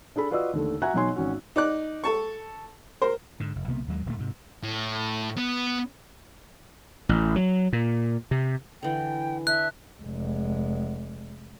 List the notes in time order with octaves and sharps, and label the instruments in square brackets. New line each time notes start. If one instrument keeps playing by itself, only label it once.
[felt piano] D4 G#4 A4 B5
F4 F#4 B4 D5 D#5 E6
D#2 D3 A3
F#4 E5 F#5 G#5 A#5 F#6
B2 F#3 D#4 C#5 G#5 C6
G#1 C#4 F#4
[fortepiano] D#4 D5 F#6
A4 A5 C#6
A#4 C5
[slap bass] G#2 D3
F1
B1 C3 A#3 B3
D#2 F#3 G#3
D1 G2 A#2 A3
G#2 C3
[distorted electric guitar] A2
B3
[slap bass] A1
F#3
A#2
C3
[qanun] D3 E3 [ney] G5
[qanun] D4 [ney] E5 [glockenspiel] F#6
[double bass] F1 G#3